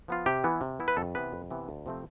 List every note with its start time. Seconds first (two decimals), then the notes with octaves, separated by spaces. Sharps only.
0.08 F3 B3 F4
0.26 C3 G4
0.44 E3 B3 E4
0.61 C3
0.80 E3 B3 E4
0.88 B4
0.97 F2 A4
1.15 C3 E3 B3 B4
1.33 F2
1.50 C3 E3 B3
1.69 D2
1.86 C3 F3 A3 C4